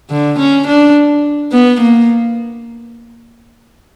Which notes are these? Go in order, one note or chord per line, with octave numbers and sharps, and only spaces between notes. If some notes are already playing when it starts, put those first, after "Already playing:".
D3
C#4
D4
B3
A#3